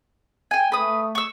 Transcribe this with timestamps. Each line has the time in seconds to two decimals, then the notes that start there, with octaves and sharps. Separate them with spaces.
0.51 G5 G#5
0.72 A3 B4 D#6
1.15 C#6 E6